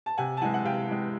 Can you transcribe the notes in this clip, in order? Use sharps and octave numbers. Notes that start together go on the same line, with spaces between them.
A5
C3 F#5 G#5
A5
E3 G#3 F#5 G#5
F#5
C3 F5 G5
E3 G#3